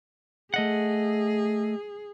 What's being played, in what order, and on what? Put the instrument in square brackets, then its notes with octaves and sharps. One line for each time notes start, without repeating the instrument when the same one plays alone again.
[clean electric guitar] A3 D#5 F#5 [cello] G#4